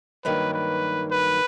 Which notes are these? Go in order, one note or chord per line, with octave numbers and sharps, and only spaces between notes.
G2 D#3 F#3 A#3 B4
B4
B4